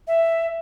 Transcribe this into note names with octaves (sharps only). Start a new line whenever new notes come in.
E5